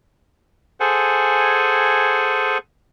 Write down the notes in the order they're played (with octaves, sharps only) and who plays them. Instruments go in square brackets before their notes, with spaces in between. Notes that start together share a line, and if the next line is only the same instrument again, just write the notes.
[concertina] G#4 A4 C5 F#5 G#5